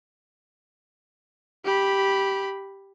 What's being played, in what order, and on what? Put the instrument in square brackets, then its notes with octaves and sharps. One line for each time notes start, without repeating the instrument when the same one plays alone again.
[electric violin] G4 B5